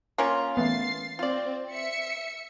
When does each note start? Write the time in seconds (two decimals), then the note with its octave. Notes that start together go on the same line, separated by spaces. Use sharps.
0.18 A#3 C#4 F4
0.57 E3 A3 B3 A6 C7
1.19 C4 F4 D5
1.71 E5 C#7